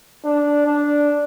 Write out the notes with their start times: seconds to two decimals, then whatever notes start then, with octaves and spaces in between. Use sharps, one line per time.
0.24 D4
0.65 D4